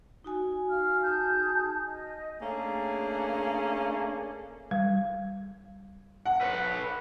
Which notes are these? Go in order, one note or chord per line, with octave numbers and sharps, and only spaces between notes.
D#4 F#4 G#5
F5 F6
G#4 A5 G6
D#5
A3 A#3 C#4 D4 G#4
G3
F#5
B4 C#5